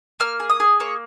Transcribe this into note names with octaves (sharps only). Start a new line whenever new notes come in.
A#3 F6
G#4
D#6
G#4
A#3 C#5